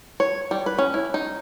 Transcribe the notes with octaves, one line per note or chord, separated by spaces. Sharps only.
C#5
G3
B4
C#4
E4
D#4